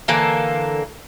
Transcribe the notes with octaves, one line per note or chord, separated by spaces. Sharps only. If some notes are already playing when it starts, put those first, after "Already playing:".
D3 E3 A#3 A4